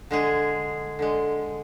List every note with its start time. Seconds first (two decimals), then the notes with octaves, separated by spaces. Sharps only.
0.11 D3 G#3 G#4
0.99 D3 G#3